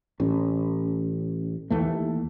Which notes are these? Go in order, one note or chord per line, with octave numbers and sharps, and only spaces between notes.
A1 C#4
D#2 E3 A3